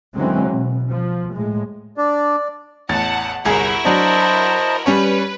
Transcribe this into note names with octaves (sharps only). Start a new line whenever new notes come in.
D3 E3 F#3 G#3 C4 C#4
B2
F3
A2 G#3
D4 D5
A1 E2 F#5 A5 A6
G1 C2 E4 F#4 G#4 A#4
F#3 D4 C5 D#5 A5
G3 C#4 B4 C#5